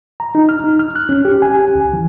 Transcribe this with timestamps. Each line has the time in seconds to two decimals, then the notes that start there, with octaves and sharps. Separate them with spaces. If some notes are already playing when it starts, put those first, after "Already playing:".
0.20 A#5
0.35 D#4
0.49 F6
0.64 D#4
0.79 F6
0.96 F#6
1.09 C#4
1.25 G4
1.42 G#5
1.75 D2
1.93 E3